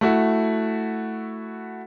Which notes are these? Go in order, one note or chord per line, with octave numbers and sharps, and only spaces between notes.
A3 E4 F#4